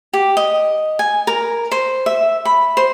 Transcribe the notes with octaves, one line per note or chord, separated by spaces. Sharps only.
G4
D#5
G#5
A#4
C5
E5
B5
C5